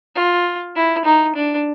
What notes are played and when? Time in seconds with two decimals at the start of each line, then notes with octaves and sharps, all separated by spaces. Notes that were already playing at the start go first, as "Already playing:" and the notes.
0.15 F4
0.75 E4
1.05 D#4
1.35 D4